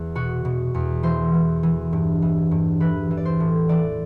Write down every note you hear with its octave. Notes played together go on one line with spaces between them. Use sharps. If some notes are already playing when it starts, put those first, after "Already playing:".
Already playing: E2
B2 F#4
B2
E2
E3 C5
E3
E3
G2
E3
G2
E3 B4
E3
D5
C5
A2
E3 D5